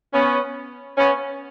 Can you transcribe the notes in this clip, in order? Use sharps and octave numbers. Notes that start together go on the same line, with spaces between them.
B3 C#4
B3 C#4